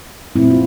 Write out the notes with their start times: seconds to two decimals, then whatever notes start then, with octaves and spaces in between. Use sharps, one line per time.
0.36 A#2 A3 C4 E4
0.50 F4